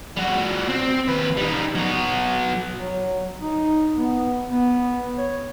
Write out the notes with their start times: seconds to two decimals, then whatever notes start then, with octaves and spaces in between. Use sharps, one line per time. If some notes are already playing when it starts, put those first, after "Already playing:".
0.16 G3 F#4
0.69 C4
1.07 D#2 B4
1.37 G3 D#4
1.75 F#3 B3
2.78 F#3
3.40 D#4
3.95 B3
4.49 B3
5.18 C#5